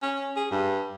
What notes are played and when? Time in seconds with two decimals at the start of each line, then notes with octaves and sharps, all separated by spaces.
0.02 C#4
0.37 G#4
0.51 G2